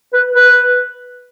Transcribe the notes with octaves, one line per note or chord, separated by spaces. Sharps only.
B4
B4